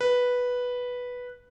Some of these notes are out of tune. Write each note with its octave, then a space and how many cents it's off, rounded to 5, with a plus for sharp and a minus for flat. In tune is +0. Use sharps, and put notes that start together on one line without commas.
B4 -5